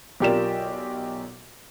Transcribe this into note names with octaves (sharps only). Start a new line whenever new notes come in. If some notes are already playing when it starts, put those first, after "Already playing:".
B1 F4 G4 A#4 D5 E7